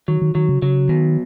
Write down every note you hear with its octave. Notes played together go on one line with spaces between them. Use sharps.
D#3 F#3
D#3
D#3 F#3
C#3
C#3 F#3
B2 D#3